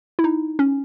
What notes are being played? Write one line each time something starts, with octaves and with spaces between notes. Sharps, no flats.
E4
D#4
C#4